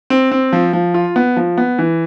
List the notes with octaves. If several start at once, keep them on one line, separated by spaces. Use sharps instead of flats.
C4
C4
F3
F3
F4
B3
F3
B3
E3